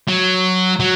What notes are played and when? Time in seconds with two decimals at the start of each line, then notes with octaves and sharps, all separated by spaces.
0.08 F#3
0.80 F#3